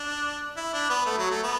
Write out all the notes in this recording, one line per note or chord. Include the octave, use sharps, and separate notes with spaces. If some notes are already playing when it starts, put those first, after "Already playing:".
Already playing: D4
E4
D4
B3
A3
F#3
A3
B3